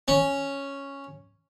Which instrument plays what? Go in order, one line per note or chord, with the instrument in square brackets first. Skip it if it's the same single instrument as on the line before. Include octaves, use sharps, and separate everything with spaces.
[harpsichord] C#4